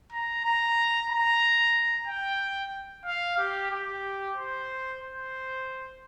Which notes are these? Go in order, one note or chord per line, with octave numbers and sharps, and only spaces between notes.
A#5
A#5
A#5
G5
F5
G4
G4
C5
C5